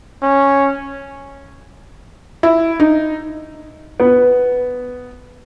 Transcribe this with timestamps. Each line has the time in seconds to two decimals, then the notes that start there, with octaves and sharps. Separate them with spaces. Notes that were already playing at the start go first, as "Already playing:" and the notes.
0.23 C#4
2.43 E4
2.80 D#4
4.00 B3